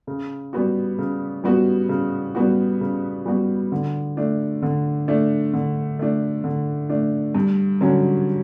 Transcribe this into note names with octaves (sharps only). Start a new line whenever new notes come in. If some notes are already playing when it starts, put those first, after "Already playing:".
C#3
G3 B3 F#4
C#3
G3 B3 F#4
C#3
G3 B3 F#4
C#3
G3 B3 F#4
D3
A3 D4
D3
A3 D4
D3
A3 D4
D3
A3 D4
G2
D3 F#3 C#4